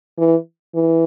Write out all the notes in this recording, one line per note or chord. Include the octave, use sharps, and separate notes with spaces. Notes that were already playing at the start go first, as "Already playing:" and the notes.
E3
E3